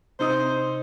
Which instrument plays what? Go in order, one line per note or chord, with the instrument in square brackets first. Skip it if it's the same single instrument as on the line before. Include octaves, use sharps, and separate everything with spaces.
[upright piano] C3 D#4 D#6 [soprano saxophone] C5